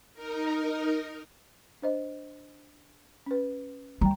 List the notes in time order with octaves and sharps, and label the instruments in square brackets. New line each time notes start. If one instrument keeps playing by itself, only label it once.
[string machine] D#4 A#4
[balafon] D4 C5 D#5
C#4 B4
[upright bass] G3 [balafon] G5 A#5